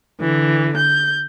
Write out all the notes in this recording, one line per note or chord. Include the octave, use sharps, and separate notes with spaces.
D3 E3
G6